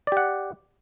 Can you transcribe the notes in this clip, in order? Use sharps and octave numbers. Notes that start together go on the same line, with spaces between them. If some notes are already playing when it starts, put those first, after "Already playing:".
G4 D5 F#5